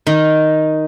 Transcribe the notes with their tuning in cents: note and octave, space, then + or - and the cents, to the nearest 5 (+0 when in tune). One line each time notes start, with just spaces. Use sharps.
D#3 +0 D#4 +0